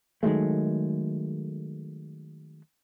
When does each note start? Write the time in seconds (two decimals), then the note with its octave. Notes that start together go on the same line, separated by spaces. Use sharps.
0.23 D#3 F#3 G#3 A3